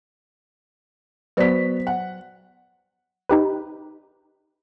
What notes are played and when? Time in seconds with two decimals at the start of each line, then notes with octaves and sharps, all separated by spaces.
1.37 F#3 B3 F#4 C5 D5 B6
1.87 F#5
3.29 D#4 G4 B4